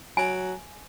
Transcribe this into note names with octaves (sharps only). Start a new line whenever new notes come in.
F#3 G#5